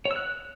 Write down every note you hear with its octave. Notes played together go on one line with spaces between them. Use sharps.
C#5
E6
F#6